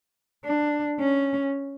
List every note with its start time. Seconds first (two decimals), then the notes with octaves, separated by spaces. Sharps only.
0.45 D4
1.00 C#4